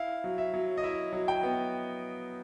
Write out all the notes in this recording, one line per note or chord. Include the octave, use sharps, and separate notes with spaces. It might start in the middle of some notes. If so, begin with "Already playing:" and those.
Already playing: E4 F5
F#3
E5
F#3
D#5
E4 E5
F#3
G5
B3